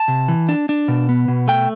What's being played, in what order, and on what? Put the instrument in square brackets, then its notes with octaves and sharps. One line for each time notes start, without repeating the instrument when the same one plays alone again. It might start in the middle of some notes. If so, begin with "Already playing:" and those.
Already playing: [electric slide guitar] A5
C3
E3
D4
D4
B2
B3
B2
A3 G5